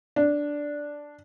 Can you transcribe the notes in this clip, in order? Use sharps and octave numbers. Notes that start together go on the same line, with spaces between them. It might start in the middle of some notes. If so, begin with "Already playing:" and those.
D4